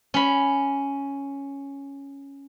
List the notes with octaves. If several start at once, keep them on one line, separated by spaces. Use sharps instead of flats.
C#4 B5